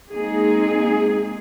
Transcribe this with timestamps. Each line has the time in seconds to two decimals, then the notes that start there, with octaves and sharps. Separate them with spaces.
0.14 G#3 A#3 C4 D#4 G#4